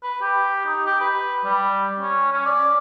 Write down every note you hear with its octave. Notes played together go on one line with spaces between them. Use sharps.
B4
G4
D#4
G4
B4
G3
C#4
C#4
D5